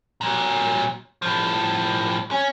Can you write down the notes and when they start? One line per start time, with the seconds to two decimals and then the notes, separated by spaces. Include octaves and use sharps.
0.21 A#2 F#3
1.22 A2 F3
2.31 C#4